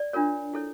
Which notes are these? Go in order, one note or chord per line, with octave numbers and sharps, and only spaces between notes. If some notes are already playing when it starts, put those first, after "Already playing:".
Already playing: D5
D4 F4 A#4 C#5
E4 A4 C#5